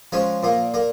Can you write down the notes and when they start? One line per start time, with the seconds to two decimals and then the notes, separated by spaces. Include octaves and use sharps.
0.12 F3 G#3 C#4
0.43 A#2 A#3
0.74 A#3